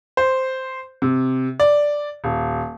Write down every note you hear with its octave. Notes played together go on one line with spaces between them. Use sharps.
C5
C3
D5
D#1